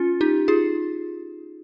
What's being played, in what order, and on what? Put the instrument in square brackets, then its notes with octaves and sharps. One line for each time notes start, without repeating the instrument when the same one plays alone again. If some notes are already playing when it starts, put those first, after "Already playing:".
Already playing: [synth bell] C#4 F4
D#4 G4
F4 G#4